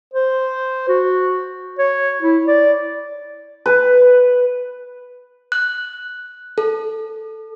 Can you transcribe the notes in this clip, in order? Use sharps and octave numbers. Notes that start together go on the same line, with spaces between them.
C5
F#4
C#5
E4
D5
B4
F#6
A4